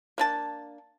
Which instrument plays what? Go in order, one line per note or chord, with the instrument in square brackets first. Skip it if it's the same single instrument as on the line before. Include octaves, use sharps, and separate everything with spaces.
[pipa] A#3 D4 A5